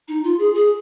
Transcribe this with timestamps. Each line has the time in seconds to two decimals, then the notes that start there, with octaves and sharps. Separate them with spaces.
0.08 D#4
0.24 F4
0.39 G#4
0.55 G#4